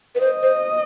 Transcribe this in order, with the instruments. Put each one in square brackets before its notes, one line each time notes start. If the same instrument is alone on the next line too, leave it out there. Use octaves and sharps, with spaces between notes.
[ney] B4
[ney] C5 [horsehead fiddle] D#5
[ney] C5